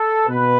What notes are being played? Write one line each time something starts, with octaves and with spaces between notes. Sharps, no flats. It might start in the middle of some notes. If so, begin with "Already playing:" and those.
Already playing: A4
B2 B4